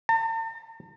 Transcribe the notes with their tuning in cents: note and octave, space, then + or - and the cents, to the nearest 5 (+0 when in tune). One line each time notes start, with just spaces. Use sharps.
A5 +45